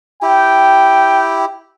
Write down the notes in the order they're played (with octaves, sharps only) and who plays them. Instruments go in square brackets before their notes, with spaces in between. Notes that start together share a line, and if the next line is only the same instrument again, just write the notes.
[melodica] E4 G4 [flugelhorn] G5